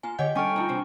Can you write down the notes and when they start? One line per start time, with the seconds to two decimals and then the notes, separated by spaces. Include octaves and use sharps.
0.03 A#3 F4 G#5
0.19 D3 G4 C#5 D#5 F#5 G5 G6
0.35 G3 C#4 D4 A4 G5 G#5 C#6 F6
0.56 A3 D4 D#4 F4
0.68 C3 E3 C5